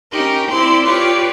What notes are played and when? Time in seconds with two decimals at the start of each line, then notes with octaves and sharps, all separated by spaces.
0.11 C#4 D#4 G4 A#4
0.50 C4 E4 D5 C6
0.83 F4 G4 B4 C#5 D5